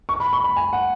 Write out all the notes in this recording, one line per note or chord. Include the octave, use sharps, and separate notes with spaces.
C#6
B5
C#6
B5
G#5
F#5